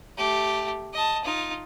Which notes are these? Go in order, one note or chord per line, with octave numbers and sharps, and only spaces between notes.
A3 G4
D#5 A5
D#4 F4